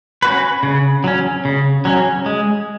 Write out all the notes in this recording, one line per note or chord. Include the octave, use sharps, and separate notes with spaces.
C#4 F#4 B4
C#3
F#3 C#4
C#3
F#3 C#4
G#3